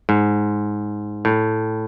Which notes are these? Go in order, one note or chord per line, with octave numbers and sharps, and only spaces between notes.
G#2
A2